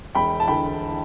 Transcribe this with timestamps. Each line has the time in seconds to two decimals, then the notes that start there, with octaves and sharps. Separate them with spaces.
0.15 E1 G5 B5
0.40 A5
0.48 D3 G5 B5